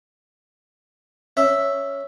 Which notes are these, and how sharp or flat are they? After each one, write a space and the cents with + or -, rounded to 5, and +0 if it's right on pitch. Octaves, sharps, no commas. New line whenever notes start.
C#4 +0 E5 +0